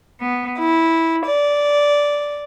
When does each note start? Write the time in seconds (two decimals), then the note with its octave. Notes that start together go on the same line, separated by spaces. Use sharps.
0.20 B3
0.59 E4
1.26 D5